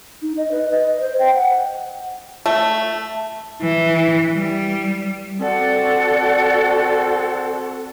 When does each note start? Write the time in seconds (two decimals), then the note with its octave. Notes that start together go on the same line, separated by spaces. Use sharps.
0.22 D#4
0.37 D#5
0.52 B4
0.70 D#5
1.00 C5
1.19 G5
1.34 F#5
2.46 A3
3.61 E3
4.34 G3
5.40 C4 F#4 A4 D5 F#5